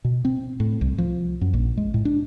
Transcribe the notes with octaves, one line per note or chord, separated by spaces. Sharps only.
B2
C4
A2
C2
F3
F#2
A#1
G#3
A2
D4